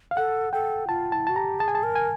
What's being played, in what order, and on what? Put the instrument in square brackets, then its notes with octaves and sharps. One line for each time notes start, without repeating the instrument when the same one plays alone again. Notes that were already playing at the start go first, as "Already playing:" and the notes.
[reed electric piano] F5
[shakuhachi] A4 [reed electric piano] F#5
[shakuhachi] A4 [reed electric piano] G5
[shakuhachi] F4 [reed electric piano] A5
[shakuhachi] E4 [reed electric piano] A5
[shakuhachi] F#4 [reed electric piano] A5
[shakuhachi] G4 [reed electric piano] A#5
[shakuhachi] G#4 [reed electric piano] A5
[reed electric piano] G#5
A5
[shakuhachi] A#4
[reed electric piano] G#5